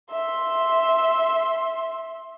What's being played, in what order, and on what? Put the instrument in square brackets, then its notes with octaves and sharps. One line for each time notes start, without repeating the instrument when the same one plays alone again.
[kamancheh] E5 C6